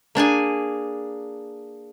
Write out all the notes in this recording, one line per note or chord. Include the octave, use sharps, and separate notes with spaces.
A#3 D4 G#4 G#5